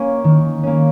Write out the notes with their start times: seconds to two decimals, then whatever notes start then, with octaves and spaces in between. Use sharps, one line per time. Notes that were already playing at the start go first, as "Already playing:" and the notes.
Already playing: A#3 C#4
0.24 D#3
0.63 A#3 C#4